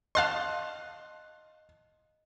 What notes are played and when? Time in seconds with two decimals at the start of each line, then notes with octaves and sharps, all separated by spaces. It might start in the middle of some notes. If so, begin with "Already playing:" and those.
0.15 D#5 F5 A5 C6 F#6